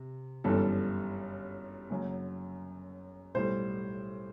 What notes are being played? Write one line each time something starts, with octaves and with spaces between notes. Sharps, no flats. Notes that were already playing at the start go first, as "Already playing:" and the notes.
Already playing: C3
G1 F#2 E3 G3 A4
F#1 F#2 F#3
B1 A2 G3 C5